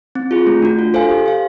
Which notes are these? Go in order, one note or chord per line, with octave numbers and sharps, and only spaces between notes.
C4
F4 G#4
A3
D4 F#4
F4
A4 C5 F5 G#5
G4
C5 F5